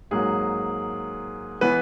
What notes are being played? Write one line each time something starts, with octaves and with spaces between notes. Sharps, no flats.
G#2 F#3 A#3 G#4
E3 B3 B4